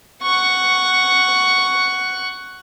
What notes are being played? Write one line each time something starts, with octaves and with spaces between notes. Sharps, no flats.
F#5 C#6